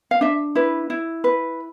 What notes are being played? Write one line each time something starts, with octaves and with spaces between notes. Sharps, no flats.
F5
D4 E5
E4 B4
E4
B4